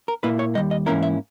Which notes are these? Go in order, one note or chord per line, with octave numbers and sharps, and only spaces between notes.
A#4
A#2 A#3 E4 B4
C#5
D#2 D#3 G3 D#5
D#5
G#2 E3 A#3 C#4 E4 A#4
E5